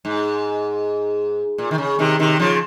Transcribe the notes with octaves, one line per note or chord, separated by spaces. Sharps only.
G#2
A#2
D#3
C#3
C3 D#3
C3 D#3
C#3 F3